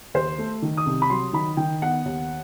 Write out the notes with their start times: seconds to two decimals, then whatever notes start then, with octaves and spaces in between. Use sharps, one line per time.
0.14 D#2 C5
0.38 A3
0.62 D#3
0.77 D#6
0.86 C2
1.02 B5
1.10 F#3 C6
1.33 D#3 B5
1.57 D#3 G5
1.82 B3 F#5
2.05 D#2